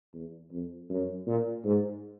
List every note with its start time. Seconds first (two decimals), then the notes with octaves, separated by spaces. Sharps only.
0.14 E2
0.51 F2
0.90 F#2
1.27 A#2
1.65 G#2